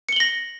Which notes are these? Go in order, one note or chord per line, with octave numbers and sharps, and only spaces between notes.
A#6 C#7 F#7 G7